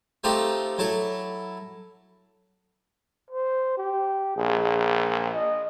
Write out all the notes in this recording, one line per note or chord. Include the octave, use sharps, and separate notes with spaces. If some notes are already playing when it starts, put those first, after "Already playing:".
A3 C4 D#4 F4 G4
F#3 E4 A4
C5
G4
A#1 G#4
D#5